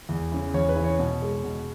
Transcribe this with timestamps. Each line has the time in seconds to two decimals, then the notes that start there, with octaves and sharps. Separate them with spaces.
0.09 E2
0.32 C#3 E3
0.54 E2 C#5
0.69 B4
0.76 C#3 E3
0.84 C#5
0.99 B2
1.22 G#3
1.44 B2